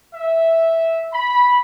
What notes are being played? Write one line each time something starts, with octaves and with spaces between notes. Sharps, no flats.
E5
B5